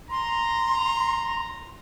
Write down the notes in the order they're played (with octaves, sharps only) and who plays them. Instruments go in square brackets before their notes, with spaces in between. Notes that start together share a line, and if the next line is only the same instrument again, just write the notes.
[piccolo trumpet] A#5 [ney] C6